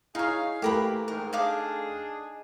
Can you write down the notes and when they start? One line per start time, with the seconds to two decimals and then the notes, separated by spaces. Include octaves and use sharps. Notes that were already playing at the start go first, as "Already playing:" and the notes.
0.15 D#4 E4 G#4 C#5 F5 A#5
0.62 E3 A3 A#3 G4 A#4 G5 B5
1.08 G#2 A#4
1.33 D4 D#4 G#4 F5 D6